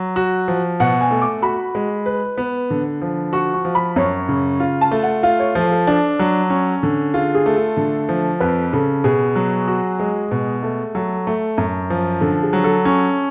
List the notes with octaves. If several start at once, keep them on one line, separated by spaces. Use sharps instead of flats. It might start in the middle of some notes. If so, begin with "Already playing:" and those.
Already playing: F#3
F#4
F3
B2 F#5
G#5
A3
D6
F#4 B5
G#3
B4
B3
D3
F3
F#4 C#6
C#6
F3
B5
F#2 C#5
C#3
F4
A5
A3
F#5
F4 F5
C#5
F3 A4
A4
D4
F#3
C#4
D3
F4 G#4
G#4
A3
A4
D3
F3
F2 B4
C#3 A4
B2 G#4
F#3
F#4
G#3
B2
A3
F#3 A4
A3
F#2
F3
D3 A4
G#4
F#3
A4
C#4